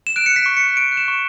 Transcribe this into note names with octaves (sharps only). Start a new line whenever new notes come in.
E7
F#6 D7
F#6 C#7
B6
C#6
F#6 C#7
C#6 D7
F#6
E7
C#6